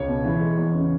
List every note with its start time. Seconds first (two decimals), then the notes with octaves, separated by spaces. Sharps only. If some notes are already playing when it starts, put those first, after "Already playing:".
Already playing: C#2 C#5
0.08 B2
0.24 E3
0.40 G#3
0.58 E2
0.74 C#3